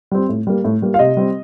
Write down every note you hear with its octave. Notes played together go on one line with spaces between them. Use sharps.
G3 C4
A2
G3 A#3
A2
G3 A#3
F5
C3 D#5
G3 C4